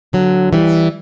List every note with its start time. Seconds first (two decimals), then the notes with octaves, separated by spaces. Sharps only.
0.13 D3 F#3
0.53 E3 G3